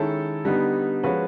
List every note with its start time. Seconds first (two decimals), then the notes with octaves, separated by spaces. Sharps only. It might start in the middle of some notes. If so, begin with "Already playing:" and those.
Already playing: D#3 G#3 C#4 E4 A4
0.45 D3 G3 B3 D#4
1.03 F3 G#3 C#4 F#4 B4